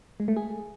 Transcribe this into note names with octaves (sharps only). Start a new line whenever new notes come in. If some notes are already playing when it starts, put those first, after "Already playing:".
G#3
A3
G#4